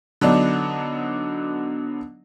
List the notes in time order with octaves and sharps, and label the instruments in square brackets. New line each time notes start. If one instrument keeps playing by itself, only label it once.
[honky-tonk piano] D3 F#3 B3 D4 D#4